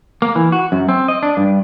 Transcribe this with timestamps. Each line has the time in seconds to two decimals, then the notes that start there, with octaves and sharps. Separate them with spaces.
0.22 A#3
0.35 E3
0.52 F#4
0.72 F#2
0.89 C4
1.08 D#5
1.23 D4
1.37 G2